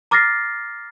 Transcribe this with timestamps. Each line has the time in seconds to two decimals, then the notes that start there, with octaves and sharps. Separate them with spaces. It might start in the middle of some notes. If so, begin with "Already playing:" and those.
0.11 A#5 D6 F6 A6 A#6 C7